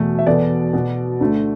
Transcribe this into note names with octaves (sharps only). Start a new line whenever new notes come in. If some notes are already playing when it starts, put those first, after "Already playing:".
Already playing: E2 B2 A3
E5
E2 B2 B3 A4 D5
B2 B3
D2 D3 A3